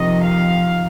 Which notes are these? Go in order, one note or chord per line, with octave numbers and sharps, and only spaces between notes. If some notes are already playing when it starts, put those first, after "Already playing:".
Already playing: F2 C3 D#3 D#5
F5